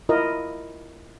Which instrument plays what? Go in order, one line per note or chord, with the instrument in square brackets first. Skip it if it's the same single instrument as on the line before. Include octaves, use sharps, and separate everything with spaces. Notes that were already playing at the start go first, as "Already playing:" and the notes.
[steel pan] E4 F4 A#4 D#5